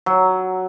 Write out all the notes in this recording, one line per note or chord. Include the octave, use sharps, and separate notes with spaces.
F#3